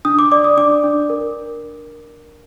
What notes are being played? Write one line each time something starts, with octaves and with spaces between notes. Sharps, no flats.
D4 D#6
D6
D5 D6
D#6
D4 D6
D4
A#4